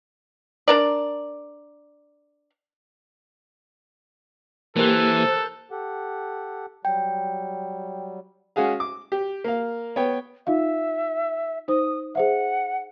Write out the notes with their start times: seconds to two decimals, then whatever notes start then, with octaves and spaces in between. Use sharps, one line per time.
0.68 D4 A#4 D5
4.77 E3 A#3 G4 A4 A#4 C5 F#6
5.71 G4 A4 F#5
6.85 F#3 G3 G5
8.56 G#3 C#4 F#4 G#4 F5
8.80 D6
9.12 G4
9.44 A#3 F5
9.96 B3 C#5 G5
10.47 D#4 F4 E5 F5
11.68 D#4 C5 D#6
12.15 G#4 C5 E5 F#5